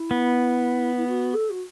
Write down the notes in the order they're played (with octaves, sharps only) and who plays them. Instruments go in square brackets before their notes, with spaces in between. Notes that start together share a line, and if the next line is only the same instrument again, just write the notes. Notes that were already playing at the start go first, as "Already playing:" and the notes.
Already playing: [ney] E4
[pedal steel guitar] B3
[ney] E4
F#4
A4
F#4